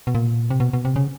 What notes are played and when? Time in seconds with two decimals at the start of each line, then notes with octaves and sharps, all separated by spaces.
0.07 B2
0.15 A#2
0.50 C3
0.60 B2
0.73 B2
0.85 C3
0.96 C#3